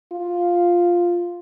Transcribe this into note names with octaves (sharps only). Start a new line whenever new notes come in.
F4